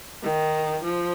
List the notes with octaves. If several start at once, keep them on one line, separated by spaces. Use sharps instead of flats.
D#3
F3